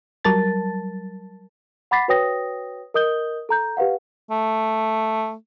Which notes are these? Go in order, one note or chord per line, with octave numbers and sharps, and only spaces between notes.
F#3 G3 A#4 A5 A6
F#5 B5 D6 A6 B6 C7
F#4 B4 C#5 G5 D#6 A#6
A#4 D#5 D#6 G6 G7
A4 A#5 G6
G4 B4 F5 F#5
A3